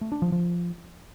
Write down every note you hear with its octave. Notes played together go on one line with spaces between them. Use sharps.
A3
D4
F3
F3